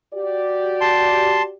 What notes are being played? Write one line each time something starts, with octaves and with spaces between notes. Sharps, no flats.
F#4 G4 D5
A5 C6